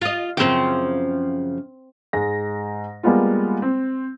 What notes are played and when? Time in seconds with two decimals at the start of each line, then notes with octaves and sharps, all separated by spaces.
0.02 F4 D#5
0.37 F#2 C#3 F3 C4 G5
2.13 G#2 G#3 A#6
3.03 G3 G#3 A#3 B3 F4
3.62 C4